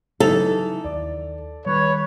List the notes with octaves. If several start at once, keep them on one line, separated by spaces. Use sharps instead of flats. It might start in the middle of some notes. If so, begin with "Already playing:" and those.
C#3 E3 F#3 D#4 A4 F7
D#2 D5
D#3 G3 B4 C#5